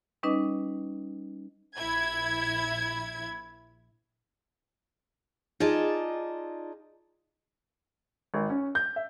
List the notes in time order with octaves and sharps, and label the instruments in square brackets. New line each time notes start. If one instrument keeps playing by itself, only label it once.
[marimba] G3 C#4 D#4 B4 D#5 D6
[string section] A#1 E4 G#6
[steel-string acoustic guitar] D#4 F4 G#4 D5 D#5 A5
[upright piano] G#1
C#4
G6
E5